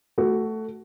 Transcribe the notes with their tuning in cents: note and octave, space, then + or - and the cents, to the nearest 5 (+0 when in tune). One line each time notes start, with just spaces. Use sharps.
A3 +0 F#4 +15